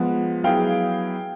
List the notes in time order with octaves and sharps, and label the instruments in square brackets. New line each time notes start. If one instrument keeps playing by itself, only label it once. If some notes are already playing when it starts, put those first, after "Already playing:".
Already playing: [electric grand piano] F3 G#3 B3 [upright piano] F#5
[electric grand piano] F#3 B3 E4 G#4 [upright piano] F5 G5